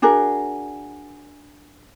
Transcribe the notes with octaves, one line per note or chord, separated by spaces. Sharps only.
D4 F#4 G#4 A#4